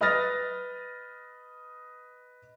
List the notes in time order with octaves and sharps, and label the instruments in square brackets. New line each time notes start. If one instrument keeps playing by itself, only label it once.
[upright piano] B4 D#5 D#6 F6 A6 A#6